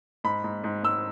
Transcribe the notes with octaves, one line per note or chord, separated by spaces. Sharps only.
G#2 B5
G#2
G#2
G#2 E6